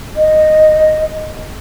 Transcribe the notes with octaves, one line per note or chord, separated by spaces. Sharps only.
D#5